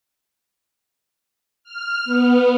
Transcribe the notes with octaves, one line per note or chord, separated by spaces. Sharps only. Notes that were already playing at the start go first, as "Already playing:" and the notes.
F6
B3